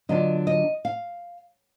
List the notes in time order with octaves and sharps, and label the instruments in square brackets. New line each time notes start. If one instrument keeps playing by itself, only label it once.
[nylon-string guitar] D3 F#3 B3 D4 F4 D#5
D#5
F5